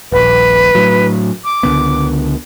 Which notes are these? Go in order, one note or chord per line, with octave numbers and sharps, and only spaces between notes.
D#1 A#1 B4
A2 F#3
D6
C#2 D3 B3